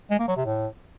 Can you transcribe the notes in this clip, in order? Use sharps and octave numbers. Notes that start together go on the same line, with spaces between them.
G#3
A#3
F#3
C3
A2